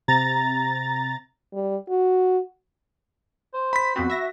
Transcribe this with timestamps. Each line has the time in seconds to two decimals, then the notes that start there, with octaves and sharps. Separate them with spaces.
0.08 C3 A#5 A6
1.53 G3
1.89 F#4
3.54 C5
3.73 B5 B6
3.96 F2 B3 C4 F#4
4.10 E5 A#6